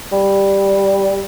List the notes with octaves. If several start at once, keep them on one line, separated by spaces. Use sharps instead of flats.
G3